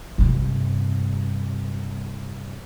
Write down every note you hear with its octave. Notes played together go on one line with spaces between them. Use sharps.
G2 C3